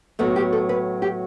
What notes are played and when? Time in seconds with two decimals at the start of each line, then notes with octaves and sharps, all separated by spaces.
0.19 A2 F#3 B3 A4
0.36 G4
0.53 A4
0.69 B4
1.02 G4